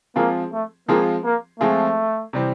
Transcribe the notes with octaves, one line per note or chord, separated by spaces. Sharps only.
F3 G#3 A#3 C4 F4 G#4
A3
F3 G#3 A#3 C4 F4 G#4
A#3
F3 G#3 A3 C4 F4 G#4
C3 E3 G3 C4